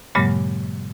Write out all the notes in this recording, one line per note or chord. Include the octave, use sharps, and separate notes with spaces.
G2 A#2 C#3 F#3 G#3 A#3